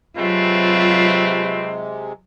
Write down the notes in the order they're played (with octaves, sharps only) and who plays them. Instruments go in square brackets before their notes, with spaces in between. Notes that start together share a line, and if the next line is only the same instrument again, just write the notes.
[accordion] C3 G#3 [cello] F#3 F4 [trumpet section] A3 C4 B4